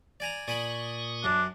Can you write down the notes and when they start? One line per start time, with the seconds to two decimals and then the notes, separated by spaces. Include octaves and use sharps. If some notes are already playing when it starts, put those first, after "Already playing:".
0.20 D5 G#5 A#5
0.48 A#2 D5 G#5 B5 C#6 D#6
1.24 F#2 D4